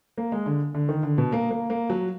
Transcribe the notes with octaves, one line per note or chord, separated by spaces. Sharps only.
A#3
G#3
D3
D3
D#3
D3
B2
A#3
A#3
A#3
F#3